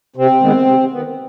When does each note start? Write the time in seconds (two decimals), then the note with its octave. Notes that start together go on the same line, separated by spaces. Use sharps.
0.16 C3 C4
0.41 D#3 G#3 B3
0.66 C3
0.91 D#3 B3